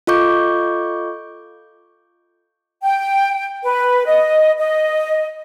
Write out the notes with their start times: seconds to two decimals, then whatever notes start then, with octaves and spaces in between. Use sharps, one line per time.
0.07 F4 A4 D#5 C#6 D6 G6
2.82 G5
3.63 B4
4.05 D#5
4.58 D#5